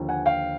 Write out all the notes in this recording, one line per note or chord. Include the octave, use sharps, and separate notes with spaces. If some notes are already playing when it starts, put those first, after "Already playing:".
Already playing: D#2 D3 F3
F#5 G#5
F5 G5